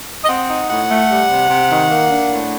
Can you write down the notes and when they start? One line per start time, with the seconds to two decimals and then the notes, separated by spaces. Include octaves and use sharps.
0.24 D#5
0.29 C4 F#5
0.50 D#4
0.70 A2 F#5
0.90 A3
1.10 G3
1.30 C3
1.50 C3
1.70 D#3
1.90 A#3
2.10 D4
2.31 A2